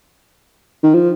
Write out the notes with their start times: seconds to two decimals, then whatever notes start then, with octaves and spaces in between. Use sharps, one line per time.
0.83 D#3
0.94 F3